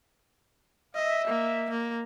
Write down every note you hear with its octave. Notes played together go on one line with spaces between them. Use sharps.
D#5 E5
A#3
A#3